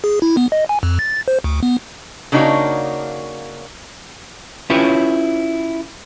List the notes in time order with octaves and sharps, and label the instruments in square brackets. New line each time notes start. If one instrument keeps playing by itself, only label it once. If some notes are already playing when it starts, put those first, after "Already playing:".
[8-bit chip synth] G#4
E4
B3
D#5
G#5
F2
A6
C5
D2
B3
[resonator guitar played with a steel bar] C#3 A#3 D4 D#4 F#4 C#5
[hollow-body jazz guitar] C#4 E4 F4 G4 B4 C#5